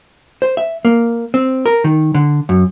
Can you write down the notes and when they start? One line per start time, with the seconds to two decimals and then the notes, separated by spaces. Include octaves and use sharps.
0.42 C5
0.57 E5
0.85 A#3
1.34 C4
1.66 A#4
1.84 D#3
2.15 D3
2.49 F#2